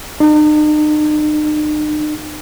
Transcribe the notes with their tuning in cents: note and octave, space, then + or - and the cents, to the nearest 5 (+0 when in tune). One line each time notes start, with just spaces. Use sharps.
D#4 -45